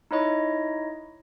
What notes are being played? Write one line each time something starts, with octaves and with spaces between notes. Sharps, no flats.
D#4 E4 C#5 D#5